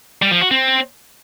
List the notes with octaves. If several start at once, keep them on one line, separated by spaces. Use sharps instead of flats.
G3
F3
F#4
C4